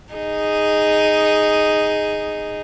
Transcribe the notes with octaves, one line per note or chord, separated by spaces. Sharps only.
D#4 G#4